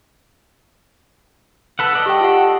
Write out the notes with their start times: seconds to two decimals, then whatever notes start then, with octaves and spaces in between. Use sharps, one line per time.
1.79 A4 B4 F#5
1.93 A4 D5 D#5
2.06 G4 G5
2.21 F4 G4 F#5